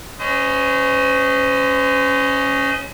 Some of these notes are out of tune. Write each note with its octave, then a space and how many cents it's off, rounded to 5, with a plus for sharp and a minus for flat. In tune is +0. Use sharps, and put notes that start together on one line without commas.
C#4 +0 C5 -40 D#5 +0